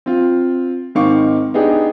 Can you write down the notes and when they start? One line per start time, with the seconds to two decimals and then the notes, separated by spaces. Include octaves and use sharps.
0.06 C4 F4
0.95 G#2 D#3 C4 F5 C#6 D6
1.54 B3 D4 D#4 G4 G#4